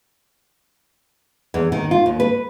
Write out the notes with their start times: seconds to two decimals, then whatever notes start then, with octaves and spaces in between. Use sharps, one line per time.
1.54 E2
1.72 D#3
1.91 F4
2.06 D#2
2.20 B4